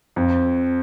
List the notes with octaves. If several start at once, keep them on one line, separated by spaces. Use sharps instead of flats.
F2